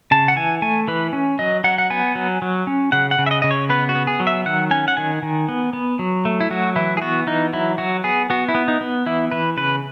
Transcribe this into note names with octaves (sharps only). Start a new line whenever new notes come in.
C#3 A5
F#5
E3 G#5
A3 G#5
E3 B4
C#4
F#3 D#5
F#3 F#5
F#5
B3 G#5
F#3
F#3
C#4
C#3 F#5
F#5
C#3
E5
D#5
C#3 D#5
C#5
B3 B4
F#4
B3
G#4
F#3
E5
D#3 F#5
C#4 G#5
F#5
D#3 G#5
D#3
B3
B3
F#3
A3
E4
F#3 F#4
E3 E4
G#4
B3 F#4
E3 D#4
F#3 E4
F#3 F#4
B3 G#4
B3 F#4
E4
B3
D#4
B3
E3 E4
E3 B4
C#3 B4